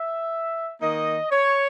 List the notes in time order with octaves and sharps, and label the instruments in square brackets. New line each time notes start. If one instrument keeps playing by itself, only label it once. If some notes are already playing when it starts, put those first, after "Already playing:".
Already playing: [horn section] E5
D#3 A#3 D#4 D#5
C#5